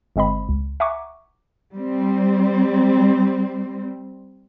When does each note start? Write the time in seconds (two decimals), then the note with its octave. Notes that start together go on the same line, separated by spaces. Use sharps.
0.16 G1 G#3 C4 D#5 B5
0.49 C#2
0.80 E5 F#5 G#5 A#5 C#6 D6
1.76 G3 C4